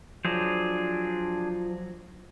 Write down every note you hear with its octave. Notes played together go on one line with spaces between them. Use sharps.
F3 F#3 D4 G#4 C5